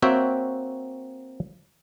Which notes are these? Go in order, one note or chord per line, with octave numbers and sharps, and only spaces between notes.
A#3 C4 F#4 C#5 E5 G5